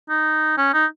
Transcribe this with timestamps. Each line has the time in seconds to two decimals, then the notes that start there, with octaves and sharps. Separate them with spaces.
0.09 D#4
0.57 C#4
0.73 D#4